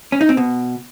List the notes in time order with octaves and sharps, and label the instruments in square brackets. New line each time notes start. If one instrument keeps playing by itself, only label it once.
[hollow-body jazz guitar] C#4
D#4
C4
B2